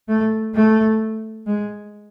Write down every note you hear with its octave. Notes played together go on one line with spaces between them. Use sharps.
A3
A3
G#3